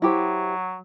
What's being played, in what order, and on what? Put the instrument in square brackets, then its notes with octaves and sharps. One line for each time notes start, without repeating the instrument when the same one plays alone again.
[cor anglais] F#3 [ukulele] E4 G4 C5